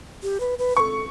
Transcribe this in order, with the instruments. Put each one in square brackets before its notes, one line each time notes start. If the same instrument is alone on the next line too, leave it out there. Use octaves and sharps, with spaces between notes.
[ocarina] G4
B4
B4
[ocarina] A4 B4 [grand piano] C#6